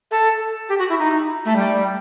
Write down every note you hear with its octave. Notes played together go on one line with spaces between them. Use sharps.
A4
G4
F#4
E4
D#4
A3
G3